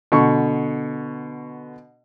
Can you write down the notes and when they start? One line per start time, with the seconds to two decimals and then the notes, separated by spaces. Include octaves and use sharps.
0.12 B2 D3 C#6